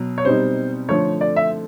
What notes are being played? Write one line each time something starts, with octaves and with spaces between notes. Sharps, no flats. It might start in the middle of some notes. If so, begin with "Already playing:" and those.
Already playing: B2 F#3
C#5
B2 G3 C4 D#4 C5
D3 F3 A3 C#5
D5
E5